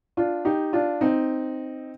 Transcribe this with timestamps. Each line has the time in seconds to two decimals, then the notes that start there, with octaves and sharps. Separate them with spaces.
0.17 D4 F4
0.45 D#4 G4
0.73 D4 F4
1.01 C4 D#4